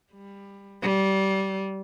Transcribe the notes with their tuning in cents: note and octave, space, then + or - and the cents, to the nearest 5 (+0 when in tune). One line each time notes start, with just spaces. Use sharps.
G3 +20
G3 -20